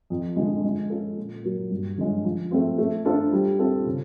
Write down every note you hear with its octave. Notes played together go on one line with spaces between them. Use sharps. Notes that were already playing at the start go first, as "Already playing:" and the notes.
F2
D3 F3 G#3
G#3
C#4 F4 A4
A#2
F#3 A#3
G2
D3 F3 G#3 C#4
F3
A3 C4 F4
A3
D4 F4 A4 C5
G3
C4 F4 A4
C#3